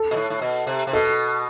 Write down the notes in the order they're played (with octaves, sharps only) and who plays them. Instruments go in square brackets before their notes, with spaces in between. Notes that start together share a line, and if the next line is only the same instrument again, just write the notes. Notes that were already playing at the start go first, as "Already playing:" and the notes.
Already playing: [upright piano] A4
[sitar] B2
A2
A2
B2
C3
C3
[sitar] B2 [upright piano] A4